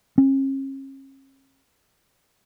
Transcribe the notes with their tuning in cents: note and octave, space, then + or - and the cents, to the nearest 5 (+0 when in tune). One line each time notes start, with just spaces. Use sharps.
C#4 -40